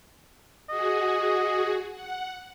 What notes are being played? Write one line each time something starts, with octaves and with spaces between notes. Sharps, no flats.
F#4 G#4 D#5
F#5